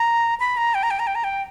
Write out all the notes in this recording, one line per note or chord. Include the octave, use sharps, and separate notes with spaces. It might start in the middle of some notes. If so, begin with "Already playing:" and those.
Already playing: A#5
B5
A#5
G5
A#5
G5
A#5
G5
A#5
G5